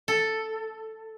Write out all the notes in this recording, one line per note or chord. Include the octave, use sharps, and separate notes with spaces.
A4